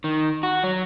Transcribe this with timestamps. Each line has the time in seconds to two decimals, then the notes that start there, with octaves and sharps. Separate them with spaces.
0.04 D#3
0.43 F#4
0.64 F#3